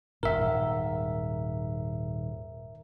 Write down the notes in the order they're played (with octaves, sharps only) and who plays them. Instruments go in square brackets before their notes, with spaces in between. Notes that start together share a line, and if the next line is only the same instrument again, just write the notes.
[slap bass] D#1 G#1 G#2 [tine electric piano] A#4 E5